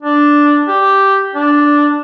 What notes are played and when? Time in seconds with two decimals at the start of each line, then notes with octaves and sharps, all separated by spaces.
0.03 D4
0.68 G4
1.33 D4